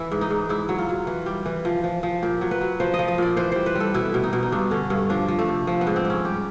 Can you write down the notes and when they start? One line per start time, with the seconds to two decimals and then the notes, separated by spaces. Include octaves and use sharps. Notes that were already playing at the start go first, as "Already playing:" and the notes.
Already playing: E3 E4
0.12 G#2
0.21 D#4
0.30 G#2
0.49 G#2 E4
0.69 F#3
0.78 F4
0.89 F#3
1.07 E3
1.26 G3
1.46 E3
1.65 F3
1.84 F3
2.03 F3
2.22 A#2 G4
2.41 F#3
2.51 B4
2.61 F#3
2.80 F3 C5
2.94 D#5
2.99 F3
3.08 D#5
3.18 A#2 D5
3.37 E3 C5
3.52 G3 C5
3.66 B4
3.75 G3 A4
3.94 B2 E4
4.14 B2
4.24 D#4
4.33 B2
4.43 D#4
4.52 G2 D4
4.71 D3 C#4
4.90 G2 C#4
5.09 F3 D4
5.28 F3
5.39 A3
5.48 C3
5.67 F3
5.81 B3
5.87 G#2
5.96 C4
6.05 G#2
6.10 C#4
6.25 G3 G4